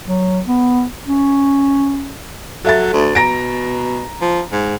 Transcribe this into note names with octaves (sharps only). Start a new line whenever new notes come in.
F#3
B3
C#4
F#3 A4 E5 A6
D2
B2 A#5 A#6 D7
F3
G#2